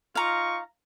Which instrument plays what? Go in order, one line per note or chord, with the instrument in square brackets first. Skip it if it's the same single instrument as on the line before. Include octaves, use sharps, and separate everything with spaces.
[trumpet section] D#4 F4 C#6 [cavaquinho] F5 A#5